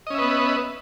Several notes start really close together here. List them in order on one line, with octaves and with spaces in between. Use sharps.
D#5 C#4 E5 B4 B3